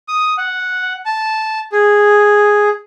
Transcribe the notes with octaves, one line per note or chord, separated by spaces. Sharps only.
D#6
F#5
A5
G#4